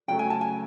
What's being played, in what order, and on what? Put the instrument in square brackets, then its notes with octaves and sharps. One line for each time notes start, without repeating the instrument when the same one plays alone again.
[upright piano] C#3 F#3 A3 [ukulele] G5
[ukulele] G#5
A5
G#5